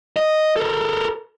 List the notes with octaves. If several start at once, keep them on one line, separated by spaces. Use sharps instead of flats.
D#5
A4 A#4